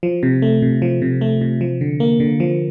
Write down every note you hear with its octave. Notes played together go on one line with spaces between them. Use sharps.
F3
C3
A3
C3
F3
C3
A3
C3
F3
D3
A#3
D3
F3